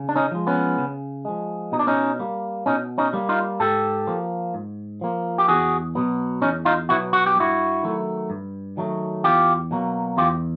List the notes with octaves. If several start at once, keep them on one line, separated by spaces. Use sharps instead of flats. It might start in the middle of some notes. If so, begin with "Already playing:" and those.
Already playing: C#3
D4
C#4 D#4
F3 G#3
B3 C#4
C#3
F3 G#3
B2 D#4
D4
C#4 D#4
G3 A#3
B2 C#4 D#4
C#4 D#4
G3 A#3
D#4 F4
G#2 G4 A4
F3 A#3
G#2
F3 A#3
G4
E2 F#4 G#4
B2 F#3 B3
E2 C#4 D#4
D#4 F4
B2 F#3 B3 E4 F#4
F#4
G4
G2 E4 F#4
D#3 F#3 A3
G2
D#3 F#3 A3
E2 F4 G4
B2 F#3 A#3
E2 F4 G4